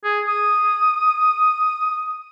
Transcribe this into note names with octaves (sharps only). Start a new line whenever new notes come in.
G#4
D#6